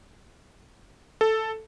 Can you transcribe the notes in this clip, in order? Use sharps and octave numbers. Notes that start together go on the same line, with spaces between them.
A4